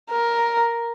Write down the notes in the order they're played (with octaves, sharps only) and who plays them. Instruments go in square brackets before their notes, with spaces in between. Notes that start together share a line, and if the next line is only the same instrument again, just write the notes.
[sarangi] A#4